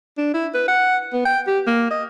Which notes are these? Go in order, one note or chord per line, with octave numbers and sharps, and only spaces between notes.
D4
E4
B4
F#5
B3
G5
G4
A#3
D#5